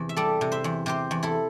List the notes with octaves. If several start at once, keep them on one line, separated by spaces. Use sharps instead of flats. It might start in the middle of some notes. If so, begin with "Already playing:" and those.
Already playing: E2 C3
E5
G3 A4 D5
C3
C5 E5
E2
C3 G4 C5
E2
E4 A4